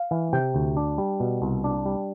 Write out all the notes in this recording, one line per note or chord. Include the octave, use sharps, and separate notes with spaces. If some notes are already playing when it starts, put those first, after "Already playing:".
Already playing: F5
E3
C3 G5
D2
D4
G3
B2
C2
D4
G3